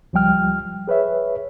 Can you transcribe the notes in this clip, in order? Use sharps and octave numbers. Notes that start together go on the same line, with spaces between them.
C#2 F3 G3 G5 F6
G#4 B4 C#5 E5